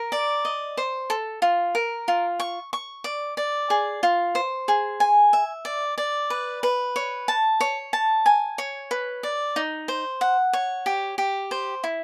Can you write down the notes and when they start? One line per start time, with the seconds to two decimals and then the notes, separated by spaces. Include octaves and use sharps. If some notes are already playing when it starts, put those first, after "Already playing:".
Already playing: A#4
0.12 D5
0.45 D#5
0.77 C5
1.10 A4
1.42 F4
1.75 A#4
2.08 F4
2.40 C#6
2.73 C#6
3.04 D5
3.37 D5
3.70 G#4
4.03 F4
4.35 C5
4.68 G#4
5.00 G#5
5.33 E5
5.65 D5
5.98 D5
6.30 B4
6.63 B4
6.96 C#5
7.28 A5
7.61 C#5
7.93 A5
8.26 G#5
8.58 C#5
8.91 B4
9.23 D5
9.56 D#4
9.88 C5
10.21 F#5
10.53 C#5
10.86 G4
11.18 G4
11.51 C5
11.84 E4